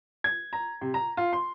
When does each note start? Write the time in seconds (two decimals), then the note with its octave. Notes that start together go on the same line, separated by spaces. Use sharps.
0.24 G#6
0.53 A#5
0.81 C3
0.94 A#5
1.17 F4
1.33 C6